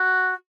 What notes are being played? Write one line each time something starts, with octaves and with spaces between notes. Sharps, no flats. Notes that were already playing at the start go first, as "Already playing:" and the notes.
Already playing: F#4